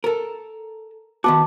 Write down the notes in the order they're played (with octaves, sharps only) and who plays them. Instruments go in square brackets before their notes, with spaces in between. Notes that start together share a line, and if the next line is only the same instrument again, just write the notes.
[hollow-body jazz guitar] A4 A#4
[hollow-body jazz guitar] D#3 B3 F#4 [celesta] A5 D6